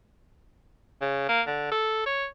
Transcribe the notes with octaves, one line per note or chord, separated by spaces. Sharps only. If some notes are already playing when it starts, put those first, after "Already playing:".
C#3
A#3
D3
A4
C#5